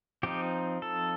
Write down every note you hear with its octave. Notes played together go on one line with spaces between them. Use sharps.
F3 C4 D#4 G4
A4